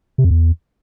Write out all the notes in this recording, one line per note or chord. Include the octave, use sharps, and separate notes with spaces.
C3
F2
E2